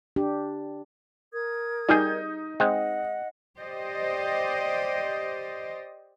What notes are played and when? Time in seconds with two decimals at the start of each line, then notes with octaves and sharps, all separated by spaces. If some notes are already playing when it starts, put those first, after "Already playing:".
0.16 D4 G4
1.33 A#4 D#6 G#6
1.89 G3 D#4 G#4 G6
2.60 G#3 C4 D#5 F#5
3.57 G4 C5 D5 D#5